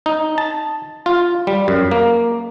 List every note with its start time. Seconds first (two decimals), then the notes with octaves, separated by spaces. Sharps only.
0.06 D#4
0.38 A5
1.06 F4
1.47 G3
1.68 F#2
1.91 A#3